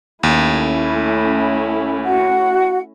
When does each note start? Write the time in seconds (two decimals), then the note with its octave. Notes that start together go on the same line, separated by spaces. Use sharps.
0.23 D#2 A3 C#4 E4
2.04 F#4 F#5